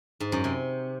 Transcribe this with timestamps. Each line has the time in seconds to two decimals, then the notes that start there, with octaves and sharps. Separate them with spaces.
0.20 G#2
0.32 F#2
0.44 C3